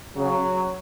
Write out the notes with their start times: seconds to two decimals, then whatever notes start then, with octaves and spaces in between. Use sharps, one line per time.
0.16 C#3 F#3